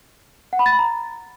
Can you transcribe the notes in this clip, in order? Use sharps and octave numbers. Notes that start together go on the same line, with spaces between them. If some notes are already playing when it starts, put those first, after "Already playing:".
F#5
B5
A6
B5
A#5